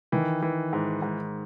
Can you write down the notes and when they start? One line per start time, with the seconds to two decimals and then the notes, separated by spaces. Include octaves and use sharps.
0.12 D#3 E3
0.42 E3
0.73 G#2
1.02 G#2